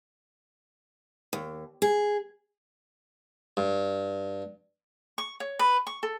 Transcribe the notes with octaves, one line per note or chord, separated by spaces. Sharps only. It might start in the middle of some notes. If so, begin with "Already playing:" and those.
D#2
G#4
G2
C#6
C#5
B4
C#6
A4